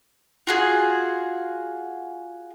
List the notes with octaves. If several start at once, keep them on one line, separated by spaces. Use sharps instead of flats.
F4 F#4 G#4